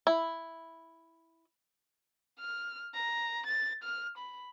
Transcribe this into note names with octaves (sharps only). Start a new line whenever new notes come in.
E4
F6
A#5
A6
F6
B5